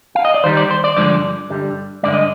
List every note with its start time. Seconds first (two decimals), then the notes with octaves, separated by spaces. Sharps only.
0.15 F5
0.25 D#5
0.34 D5
0.43 D#2 D#3 G3 C5
0.57 D5
0.71 C5
0.84 D5
0.97 G2 D3 F3 G#3 D5
1.50 G2 D3 G3
2.03 G2 D3 G#3 D5
2.13 D#5